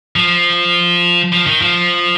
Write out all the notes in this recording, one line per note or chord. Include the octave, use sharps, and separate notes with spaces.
F3
F3
D#3
F3